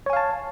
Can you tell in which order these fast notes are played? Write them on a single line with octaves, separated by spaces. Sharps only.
C#5 G#5 F5 A5